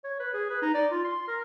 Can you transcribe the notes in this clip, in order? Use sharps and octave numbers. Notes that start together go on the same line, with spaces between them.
C#5
B4
G#4
B4
D#4
D5
F4
C6
A#4